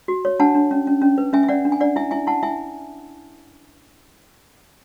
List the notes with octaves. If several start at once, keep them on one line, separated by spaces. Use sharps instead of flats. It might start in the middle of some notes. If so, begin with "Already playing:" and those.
F#4
C#5
D4 F#5 A5
D4
C#4
C#4
C#4
B4
C#4 E5 G#5
E5
C#4 D5 F#5
D4
G#5
D4 D5 F#5
E4 E5 G#5
E4 E5 G#5
E4 F#5 A5
E4 E5 G#5